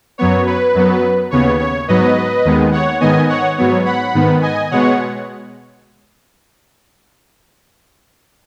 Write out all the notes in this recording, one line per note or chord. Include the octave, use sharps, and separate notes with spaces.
F#2 F#3 B3 C#5
B4
F#2 F#3 B3
D#2 C#3 B3 C#5
C#5
G#2 F#3 B3 B4 D#5
D#2 D#3 G#3 B3
C#5 F#5
G#2 D#3 B3 D#5 G#5
C#5 F#5
G#2 F#3 B3 C#5
F#5 B5
G#2 D#3 B3
D#5 G#5
B2 G#3 B3 C#5 F#5